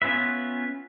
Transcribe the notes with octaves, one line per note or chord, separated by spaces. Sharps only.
B3 C#4 F4 B4 E5